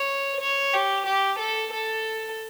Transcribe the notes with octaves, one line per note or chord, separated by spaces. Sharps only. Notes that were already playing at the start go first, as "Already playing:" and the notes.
Already playing: C#5
C#5
G4
G4
A4
A4